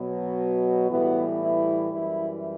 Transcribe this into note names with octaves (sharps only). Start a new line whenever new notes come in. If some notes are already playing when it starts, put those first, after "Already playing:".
Already playing: B2 F#3
A2 E3 G3 B3
E4
F#2 E3 G3 E4